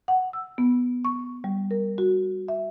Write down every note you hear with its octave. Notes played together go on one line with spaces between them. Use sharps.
F#5
E6
B3
C#6
G3
A#4
F#4
E5